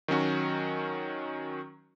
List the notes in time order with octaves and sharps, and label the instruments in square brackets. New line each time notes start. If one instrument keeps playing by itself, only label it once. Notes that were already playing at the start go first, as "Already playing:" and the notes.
[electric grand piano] D#3 F#3 C#4 F#4